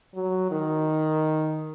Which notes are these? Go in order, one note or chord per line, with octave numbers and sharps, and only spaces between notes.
F#3
D#3